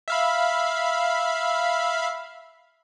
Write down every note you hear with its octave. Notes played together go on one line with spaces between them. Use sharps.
E5 F5 B5